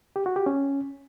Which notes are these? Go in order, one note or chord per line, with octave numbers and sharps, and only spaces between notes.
G4
F#4
G4
C#4